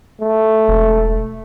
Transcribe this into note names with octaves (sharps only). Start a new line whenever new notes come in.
A3
E1